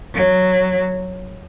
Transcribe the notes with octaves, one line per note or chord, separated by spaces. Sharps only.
F#3